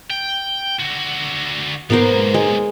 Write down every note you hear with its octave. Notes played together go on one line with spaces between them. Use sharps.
G5
D3 F#4
B1 G#2 A#3 B3 A#4 C5
G#3